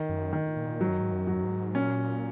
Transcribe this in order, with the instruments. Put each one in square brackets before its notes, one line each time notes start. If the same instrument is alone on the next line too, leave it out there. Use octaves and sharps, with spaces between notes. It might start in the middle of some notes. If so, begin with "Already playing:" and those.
Already playing: [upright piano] D#3
[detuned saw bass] F#2
[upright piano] D#3
[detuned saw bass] A#2
[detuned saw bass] G#2 [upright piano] F#3
[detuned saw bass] F#2
G#2
F#2
[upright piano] F#3
[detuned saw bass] F#2
G#2
[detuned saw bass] A#2 [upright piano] C#4